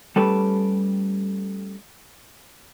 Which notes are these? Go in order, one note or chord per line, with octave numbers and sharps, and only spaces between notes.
G3 A3 C#4 G4 A4 B4